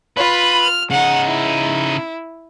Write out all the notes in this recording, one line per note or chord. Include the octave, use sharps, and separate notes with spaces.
F4 B4 B5
F6
C#3 D#4 F#5
E4